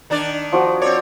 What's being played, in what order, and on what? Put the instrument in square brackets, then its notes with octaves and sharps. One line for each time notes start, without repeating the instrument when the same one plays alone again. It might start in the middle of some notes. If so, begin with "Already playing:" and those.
[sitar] D#3 D4 D5
[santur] F3 F#4 D6
[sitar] C4 C#5 [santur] D5